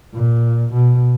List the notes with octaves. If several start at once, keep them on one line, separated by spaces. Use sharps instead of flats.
A#2
B2